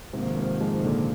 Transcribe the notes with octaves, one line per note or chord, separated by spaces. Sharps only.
F2 G#2 C3 D#3 A#3
G#2 C3
F3 G#3
A#2 D3